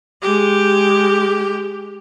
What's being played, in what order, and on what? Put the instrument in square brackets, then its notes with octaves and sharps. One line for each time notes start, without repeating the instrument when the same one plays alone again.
[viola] G#3 G4